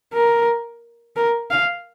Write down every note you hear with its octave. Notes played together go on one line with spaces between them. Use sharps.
A#4
A#4
F5